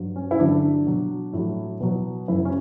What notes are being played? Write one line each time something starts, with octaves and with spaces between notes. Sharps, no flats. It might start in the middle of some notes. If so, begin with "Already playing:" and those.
Already playing: G2 F#3
C#4
E4
G2 D3 F#3 D4
B2 F#3
A2 F#3
B2 F#3
F#2 C#3 F#3 E4
C#4